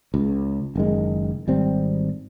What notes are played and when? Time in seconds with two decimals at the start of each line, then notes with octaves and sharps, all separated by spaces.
0.14 C#2
0.76 F#1 D#3 G#3
1.48 G#1 G3 C4